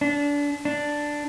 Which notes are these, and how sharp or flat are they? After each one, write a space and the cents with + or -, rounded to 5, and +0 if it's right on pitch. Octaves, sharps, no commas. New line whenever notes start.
D4 -25
D4 +0